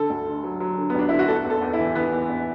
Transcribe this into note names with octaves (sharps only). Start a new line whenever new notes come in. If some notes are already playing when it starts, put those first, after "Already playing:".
Already playing: D3 A4
D2
D3
F#3
F#3
D3
B3
D2 D4
D3 E4
F#4
E2 A4
E2
A4
E2
E4
E3
E3 B3
E2
E2